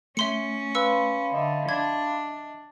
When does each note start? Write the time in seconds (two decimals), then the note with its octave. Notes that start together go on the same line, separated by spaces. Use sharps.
0.17 A3 C#4 E5 C6 C#7
0.75 B4 F5 B5 C6 E6 C#7
1.34 D3 D#5 E5
1.69 D4 G#6